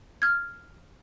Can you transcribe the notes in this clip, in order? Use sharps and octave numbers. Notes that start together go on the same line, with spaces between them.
F6 G#6